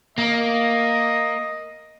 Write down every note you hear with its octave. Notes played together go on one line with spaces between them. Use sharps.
A#3 D#5